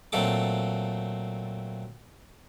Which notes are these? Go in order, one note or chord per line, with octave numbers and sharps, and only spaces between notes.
A#2 F#3 A3 C4 A4 D6